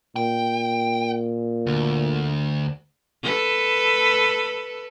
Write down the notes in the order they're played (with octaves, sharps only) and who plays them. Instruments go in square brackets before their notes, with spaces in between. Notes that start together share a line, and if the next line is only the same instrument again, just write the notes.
[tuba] A#2 [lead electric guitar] G5
[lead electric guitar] D2
[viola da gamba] A4 B4